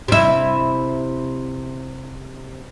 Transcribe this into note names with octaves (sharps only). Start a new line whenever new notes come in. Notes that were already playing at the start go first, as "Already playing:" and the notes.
C3 E4